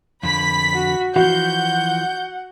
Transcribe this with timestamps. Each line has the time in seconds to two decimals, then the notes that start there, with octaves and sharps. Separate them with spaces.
0.23 F2 D3 B5 B6
0.73 F#4
1.16 E3 F3 F#4 F#5 G6